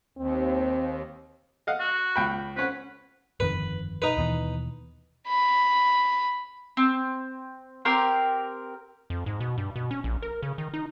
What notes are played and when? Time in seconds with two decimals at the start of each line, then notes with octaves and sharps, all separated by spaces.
0.18 D#2 C4
1.67 D#5 F5 F#5
1.80 F#4
2.16 C#2 G5 B5
2.56 C4 C#4 B4 F#5
3.40 G1 F2 D#3 B4
4.02 D#4 B4
4.17 D#2 B2 E3
5.27 B5
6.77 C4
7.85 C4 G4 A#4 C6
9.10 F2
9.26 G#2
9.40 B2
9.58 G2
9.76 B2
9.91 C#4
10.04 A#1
10.22 A#4
10.42 C#3
10.58 D#3
10.74 D#4